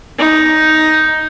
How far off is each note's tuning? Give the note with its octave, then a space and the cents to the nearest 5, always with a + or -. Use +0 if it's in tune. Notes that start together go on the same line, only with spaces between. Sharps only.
D#4 +5